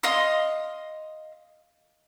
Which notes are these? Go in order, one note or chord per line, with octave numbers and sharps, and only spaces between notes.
D#5 F5 C6 D#6